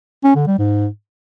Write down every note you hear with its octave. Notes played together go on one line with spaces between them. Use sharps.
C#4
D3
G3
G#2